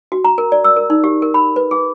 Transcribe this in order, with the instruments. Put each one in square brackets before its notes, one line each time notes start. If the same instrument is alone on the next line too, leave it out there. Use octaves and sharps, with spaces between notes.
[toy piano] F#4
A#5
A#4
D5
E6
A#4
D#4
G4
A#4
B5
B4
G#4